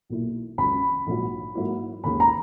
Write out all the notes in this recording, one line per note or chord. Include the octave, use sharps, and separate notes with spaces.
B1 A#2 A#3 E4
C#2 C#3 F#3 B5
A#1 G#2 F#3
G#2 F#3 A#3 E4
D#2 C#3 G#3 B5
A#5